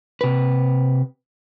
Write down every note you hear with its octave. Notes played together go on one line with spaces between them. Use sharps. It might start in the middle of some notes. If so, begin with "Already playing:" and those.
C3 B4